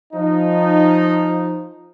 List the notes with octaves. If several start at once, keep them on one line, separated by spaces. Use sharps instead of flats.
F3 D#4